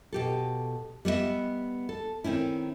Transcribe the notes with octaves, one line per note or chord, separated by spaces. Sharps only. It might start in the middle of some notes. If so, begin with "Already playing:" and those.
B2 G4 A4
G3 B3 E4 D#5 E5
A4
D#3 C4 C#4 E4